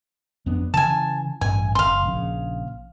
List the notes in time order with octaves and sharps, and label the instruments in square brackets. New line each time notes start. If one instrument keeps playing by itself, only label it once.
[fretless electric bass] F2 B3 D4
[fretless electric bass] C#3 E3 [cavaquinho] G#5 A5
[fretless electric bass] A1 G2 [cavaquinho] G#5
[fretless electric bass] F#1 [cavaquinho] F5 C6
[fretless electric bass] A#1 C#3